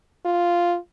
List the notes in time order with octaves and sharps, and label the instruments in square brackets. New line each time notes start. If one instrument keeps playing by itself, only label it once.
[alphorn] F4